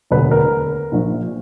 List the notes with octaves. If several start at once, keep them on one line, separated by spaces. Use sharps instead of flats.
E1 D2 D3 B4
A#4
A#1 A#2 F3